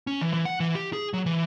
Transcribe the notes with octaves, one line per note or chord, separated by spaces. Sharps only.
C#4
E3
E3
F#5
E3
G4
G#4
F#3
E3